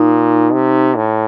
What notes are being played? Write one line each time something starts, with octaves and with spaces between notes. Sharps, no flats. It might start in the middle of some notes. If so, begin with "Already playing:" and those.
Already playing: A#2 D#4
C3
A2